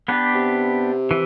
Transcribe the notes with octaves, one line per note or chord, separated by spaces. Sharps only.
B3 D4 G4 B4
C3
E3